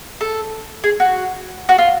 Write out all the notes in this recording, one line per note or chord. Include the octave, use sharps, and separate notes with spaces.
A4
G#4
F#4
F#4
F4